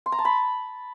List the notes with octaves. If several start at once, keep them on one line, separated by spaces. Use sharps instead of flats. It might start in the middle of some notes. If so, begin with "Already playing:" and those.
C6
A#5
A5
B5